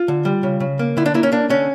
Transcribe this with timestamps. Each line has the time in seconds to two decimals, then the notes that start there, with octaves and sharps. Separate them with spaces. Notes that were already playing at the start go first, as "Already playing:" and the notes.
Already playing: F4
0.08 D3
0.25 G3
0.43 C#3
0.60 C#3
0.79 A#3
0.97 D3 E4
1.06 D4
1.14 A#3 E4
1.23 C#4
1.32 A#3 D4
1.50 D3 C#4